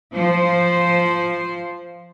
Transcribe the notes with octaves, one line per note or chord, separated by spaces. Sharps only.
F3 C5